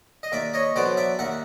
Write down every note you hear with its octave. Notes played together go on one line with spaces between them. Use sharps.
D#5
D#2 D5 E5
C#5 D#5
D3 F#3 B3 C5 D5
D5 E5
D#2 E5 F#5